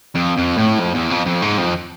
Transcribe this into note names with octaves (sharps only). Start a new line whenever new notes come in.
F2
F2
A2
F2
E2
F2
F2
G#2
F2